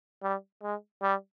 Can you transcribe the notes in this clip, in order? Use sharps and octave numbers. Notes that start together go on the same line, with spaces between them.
G3
G#3
G3